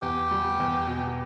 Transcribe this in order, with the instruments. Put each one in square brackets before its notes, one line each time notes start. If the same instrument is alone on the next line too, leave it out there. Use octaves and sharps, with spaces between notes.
[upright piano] E2 [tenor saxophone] G4
[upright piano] G3
E2
B2